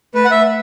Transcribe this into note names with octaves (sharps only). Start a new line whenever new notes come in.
A3 B4
F#5
E5